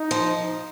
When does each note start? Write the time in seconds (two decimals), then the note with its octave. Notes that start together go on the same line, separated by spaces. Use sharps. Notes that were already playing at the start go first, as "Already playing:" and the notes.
Already playing: D#4
0.11 F3